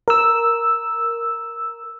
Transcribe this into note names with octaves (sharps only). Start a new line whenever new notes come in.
A#4 E6